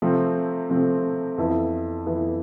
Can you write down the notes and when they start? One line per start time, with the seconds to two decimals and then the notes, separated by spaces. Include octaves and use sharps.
0.02 C3 F3 A3 C4
0.70 C3 F3 A3 C4
1.38 F2 E3 B3 E4
2.06 F2 E3 B3 E4